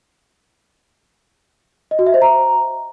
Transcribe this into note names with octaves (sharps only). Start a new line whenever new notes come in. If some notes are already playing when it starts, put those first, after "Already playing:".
D#5
F#4
E5
C5
A#5